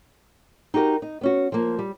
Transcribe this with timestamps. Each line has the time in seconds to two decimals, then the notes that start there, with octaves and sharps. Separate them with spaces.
0.74 D#4 F#4 G4 A#4
1.02 D#4
1.21 B3 C#4 F#4
1.52 F3 A#3
1.79 G3